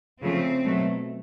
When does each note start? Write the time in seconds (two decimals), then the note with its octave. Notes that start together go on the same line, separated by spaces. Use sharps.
0.22 C#3 F3 A3 C4
0.64 B2 F#3 A3